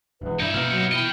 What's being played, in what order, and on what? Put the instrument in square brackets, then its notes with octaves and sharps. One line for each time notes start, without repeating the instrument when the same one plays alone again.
[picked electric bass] E1 E2 [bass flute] B4
[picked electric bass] G2 [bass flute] E3 [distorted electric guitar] D#4 E5 [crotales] G6 G#6
[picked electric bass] B2 A#3 B3 [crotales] F6
[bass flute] F#3 [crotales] C#7
[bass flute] E4 [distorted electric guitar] D#5 G5 [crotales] G7